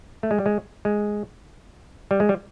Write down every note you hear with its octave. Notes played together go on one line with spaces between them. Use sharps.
A3
G#3
G3
G#3
G#3
G3
G#3
G3